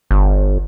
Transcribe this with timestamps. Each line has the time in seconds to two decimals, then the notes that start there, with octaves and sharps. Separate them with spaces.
0.11 G1